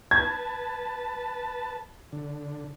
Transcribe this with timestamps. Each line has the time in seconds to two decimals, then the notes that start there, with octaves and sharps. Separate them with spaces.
0.11 B4 A5 G#6
2.13 D3